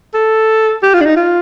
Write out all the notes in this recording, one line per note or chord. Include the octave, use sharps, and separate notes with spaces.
A4
G4
F4
D4
D#4
F4